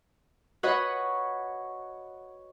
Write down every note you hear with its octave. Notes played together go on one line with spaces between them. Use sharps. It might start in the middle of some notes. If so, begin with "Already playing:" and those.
F#4 B4 C#5 D#5 F#5